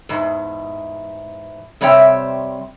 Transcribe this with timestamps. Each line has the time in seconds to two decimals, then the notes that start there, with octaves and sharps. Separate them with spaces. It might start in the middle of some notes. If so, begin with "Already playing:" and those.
0.09 E2 G#2
1.81 C3 G3 C4 C#5 E5 G5